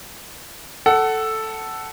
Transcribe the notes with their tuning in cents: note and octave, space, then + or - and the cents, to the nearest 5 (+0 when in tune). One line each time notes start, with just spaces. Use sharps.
A4 +0 F#5 +20